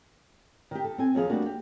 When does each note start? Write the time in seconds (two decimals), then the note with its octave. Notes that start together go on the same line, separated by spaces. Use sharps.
0.71 D#3 G4
0.84 A4
0.98 C4 G#5
1.15 D#2 F3 G#4 F5
1.29 G3 A3 A#3 D4 F#4
1.46 G4